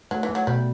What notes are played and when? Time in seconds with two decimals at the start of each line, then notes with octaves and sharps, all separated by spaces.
0.11 F#3 A3
0.23 E3
0.29 A3
0.35 F#3
0.47 B2 G3